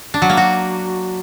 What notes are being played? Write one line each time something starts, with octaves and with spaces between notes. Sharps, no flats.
D4
F#3
A#3
F#4